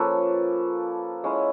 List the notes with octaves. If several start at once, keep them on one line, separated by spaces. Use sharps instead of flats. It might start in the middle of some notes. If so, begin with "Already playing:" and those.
Already playing: F3 A#3 C#4 A4 B4
G#3 C#4 E4